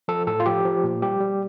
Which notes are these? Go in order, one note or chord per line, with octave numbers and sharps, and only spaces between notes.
F3 A4
A2 A4
F4
F3 G4
F3
A#2
G3 G4
G3